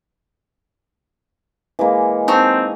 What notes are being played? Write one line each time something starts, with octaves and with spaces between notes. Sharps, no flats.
E3 G#3 A#3
C4 D#4 A5 C#6